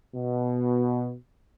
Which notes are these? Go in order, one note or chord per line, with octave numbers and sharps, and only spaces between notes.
B2